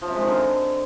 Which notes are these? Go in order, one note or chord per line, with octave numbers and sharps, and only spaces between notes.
F3
C3
G#3
D#3
D3